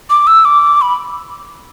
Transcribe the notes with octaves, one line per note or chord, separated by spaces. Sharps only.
D6
E6
D6
B5